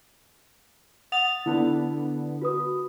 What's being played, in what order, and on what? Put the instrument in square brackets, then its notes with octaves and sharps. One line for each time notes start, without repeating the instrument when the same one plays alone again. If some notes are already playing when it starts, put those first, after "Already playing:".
[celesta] F#5 D#6 F7 [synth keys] A6
[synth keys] D3 B3 [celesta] E4
[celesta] F#4 B4 D#6